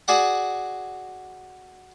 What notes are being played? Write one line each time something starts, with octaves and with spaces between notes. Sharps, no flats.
F#4 G#4 D5 F#5